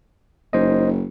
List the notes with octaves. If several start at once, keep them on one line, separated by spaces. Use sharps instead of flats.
F#1 D#4 C5 D#5